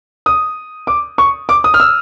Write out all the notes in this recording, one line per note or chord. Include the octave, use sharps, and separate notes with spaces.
D#6
D6
C#6
D6
D#6
F6
E6